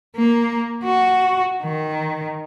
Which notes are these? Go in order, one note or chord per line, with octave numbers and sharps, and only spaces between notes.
A#3
F#4
D#3